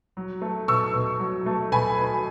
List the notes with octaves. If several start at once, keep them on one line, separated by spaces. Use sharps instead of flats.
F#3
A3
B2 C#6 E6
B2
F#3
A3
B2 G#5 B5
B2